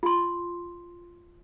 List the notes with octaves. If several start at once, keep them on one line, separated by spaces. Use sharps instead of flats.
F4 C6